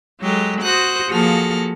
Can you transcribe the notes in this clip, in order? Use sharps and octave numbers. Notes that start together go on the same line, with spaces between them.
F#3 G#3 G4 A4
F#4 C5 D#6 F#6
F3 A#3 F#4 G#4 A4 F6